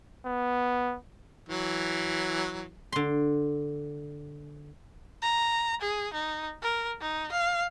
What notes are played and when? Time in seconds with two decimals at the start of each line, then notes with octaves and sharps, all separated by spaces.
0.25 B3
1.49 E3 F#3
2.92 D3 C6
5.22 A#5
5.81 G#4
6.13 D#4
6.62 A#4
7.01 D#4
7.32 F5